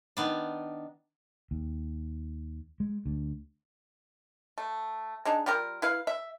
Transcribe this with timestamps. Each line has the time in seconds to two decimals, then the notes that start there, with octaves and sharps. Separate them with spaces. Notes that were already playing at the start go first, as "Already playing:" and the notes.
0.17 D#3 B3 D4
1.51 D#2
2.80 G#3
3.06 D2
4.58 A3
5.25 G#3 D4 D#4
5.46 G3 F4 G4 A#4
5.82 E4 B4 F5
6.07 E5